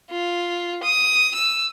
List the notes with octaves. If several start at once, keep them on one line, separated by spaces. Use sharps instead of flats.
F4
D#6
E6